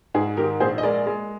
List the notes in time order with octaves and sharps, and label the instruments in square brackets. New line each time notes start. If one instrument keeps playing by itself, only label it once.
[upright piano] G#2 G#4
D#3 G4 A#4
A#1 G#4 C5
D#5
G#3 A#4 D5
G#3